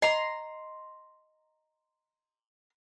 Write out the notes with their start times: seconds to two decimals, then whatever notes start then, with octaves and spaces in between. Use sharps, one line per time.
0.02 D#5 A#5 C6